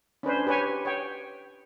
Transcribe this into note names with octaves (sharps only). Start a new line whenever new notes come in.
C#4 D4 B4 C5
G4 B4 C#5 G#5
C#5 G5